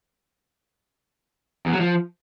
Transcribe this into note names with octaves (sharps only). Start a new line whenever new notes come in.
E2
F#3
F3